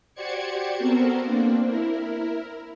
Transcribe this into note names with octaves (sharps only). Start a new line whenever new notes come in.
F#4 G4 C5 D5 G#6 C#7
B3 C4 F#4 A4 A#4 C5
A#3 C4 D4
E4 A#4